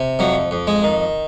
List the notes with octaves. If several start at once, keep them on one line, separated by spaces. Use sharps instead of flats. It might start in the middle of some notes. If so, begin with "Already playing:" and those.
Already playing: C3
F2 F#3
F2
G#3
D#3